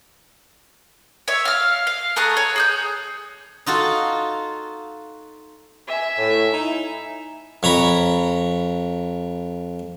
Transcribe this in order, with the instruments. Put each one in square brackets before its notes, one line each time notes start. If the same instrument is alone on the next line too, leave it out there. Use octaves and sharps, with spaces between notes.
[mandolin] C#5 E5
F5 F6
F5
A3 G#4 A#5 F#6
C#5
G#4 D#6 G6
[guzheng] D#4 F4 F#4 A4
[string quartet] E5 G#5
[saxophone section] A2
D#4 E4
[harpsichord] F2 C#5 A#5 B5 C#6